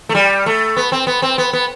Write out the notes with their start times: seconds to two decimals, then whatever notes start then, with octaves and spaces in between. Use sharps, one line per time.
0.09 A3
0.15 G3
0.46 A3
0.77 B3
0.92 C4
1.07 B3
1.22 C4
1.38 B3
1.53 B3